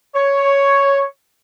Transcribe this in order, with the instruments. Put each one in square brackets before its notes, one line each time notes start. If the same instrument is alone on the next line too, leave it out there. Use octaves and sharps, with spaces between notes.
[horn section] C#5